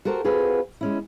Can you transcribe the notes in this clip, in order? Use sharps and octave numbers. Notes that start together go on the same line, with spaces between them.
F#4 G4 A4 A#4 C5
C4 F4 F#4 G#4 B4
G#3 C#4 E4